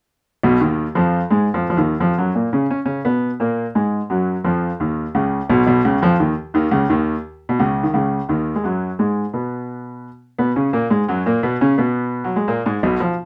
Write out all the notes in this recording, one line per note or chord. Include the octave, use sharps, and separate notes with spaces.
B1 B2
D#2 D#3
F2 F3
G#2 G#3
F2 F3
F3
D#2 D#3
F2 F3
F#2 F#3
A#2 A#3
C#3 C#4
C#4
C#3 C#4
B2 B3
A#2 A#3
G#2 G#3
F#2 F#3
F2 F3
D#2 D#3
C#2 C#3
B1 B2
B1 B2
C#2 C#3
F2 F3
D#2 D#3
D#2 D#3
C#2 C#3
D#2 D#3
B2
C#2 C#3
D#3
C#2 C#3
D#2 D#3
G#3
F#2 F#3
G#2 G#3
B2 B3
B2 B3
C#3 C#4
A#2 A#3
G#2 G#3
F#2 F#3
A#2 A#3
B2 B3
C#3 C#4
B2 B3
F#3
G#3
A#2 A#3
G#2 G#3
B1 B2
F3